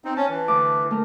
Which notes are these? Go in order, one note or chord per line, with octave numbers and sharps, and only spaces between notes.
C4 D#4
C#4 A5
E3
D2 D6
A3 A#4